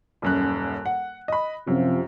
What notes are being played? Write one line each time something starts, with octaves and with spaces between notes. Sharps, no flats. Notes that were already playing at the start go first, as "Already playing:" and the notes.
D#1 F#2 F#6
F#5
D#5 B5
F#2 C3 F3